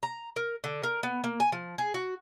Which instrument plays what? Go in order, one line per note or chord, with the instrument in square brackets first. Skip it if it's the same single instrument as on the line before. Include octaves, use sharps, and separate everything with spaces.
[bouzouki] A#5
A#4
D3
A#4
B3
A#3
G#5
F3
G#4
F#4